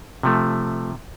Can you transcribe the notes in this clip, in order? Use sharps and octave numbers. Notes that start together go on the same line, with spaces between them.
C3 F3 A3